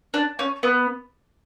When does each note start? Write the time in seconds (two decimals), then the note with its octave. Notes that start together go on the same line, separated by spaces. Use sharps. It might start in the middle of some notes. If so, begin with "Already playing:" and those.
0.14 D4
0.39 C#4
0.63 B3